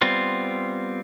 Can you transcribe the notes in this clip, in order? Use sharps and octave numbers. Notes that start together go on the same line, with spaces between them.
G3 B3 C4 F4